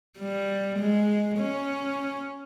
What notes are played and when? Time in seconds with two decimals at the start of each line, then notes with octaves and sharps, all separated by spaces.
0.19 G3
0.79 G#3
1.38 C#4